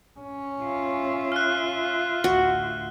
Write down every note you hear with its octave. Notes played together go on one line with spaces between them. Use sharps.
C#4
F4 E5
F6 F#6
A1 D2 F#4